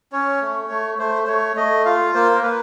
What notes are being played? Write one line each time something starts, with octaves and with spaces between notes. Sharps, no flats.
C#4 C#5
A3
A3
A3 C5
C5
A3 C#5
A3 D#5
F4 F5
A#3 C5
A#4
A#3 B4